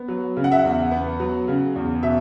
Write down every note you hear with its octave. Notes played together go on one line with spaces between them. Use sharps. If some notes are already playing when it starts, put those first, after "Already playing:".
Already playing: B3
F#3
C#3
F#5
E5
F#5
E2
B3
F#3
C#3
E2
B2 E5